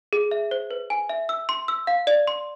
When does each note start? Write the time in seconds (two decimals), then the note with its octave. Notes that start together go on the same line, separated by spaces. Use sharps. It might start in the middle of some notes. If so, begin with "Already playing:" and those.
0.13 G#4
0.31 E5
0.51 C5
0.71 B4
0.90 G#5
1.09 E5
1.29 E6
1.49 C6
1.68 E6
1.87 F5
2.07 D5
2.27 C6